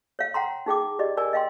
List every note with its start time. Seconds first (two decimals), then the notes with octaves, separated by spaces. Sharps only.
0.19 C#5 F5
0.34 F#5 G5 A#5 C6
0.66 D#4 G#4 G5 D6
0.99 G4 D5 D#5
1.17 A#4 D5 G#5
1.33 D#5 F5 G5 C6